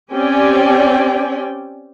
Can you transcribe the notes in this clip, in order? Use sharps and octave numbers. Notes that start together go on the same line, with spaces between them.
C4 C#4 G4 D5 G5 G#5